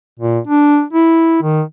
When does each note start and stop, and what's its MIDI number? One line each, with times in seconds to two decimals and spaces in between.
0.19 0.39 46
0.47 0.83 62
0.93 1.39 64
1.42 1.62 51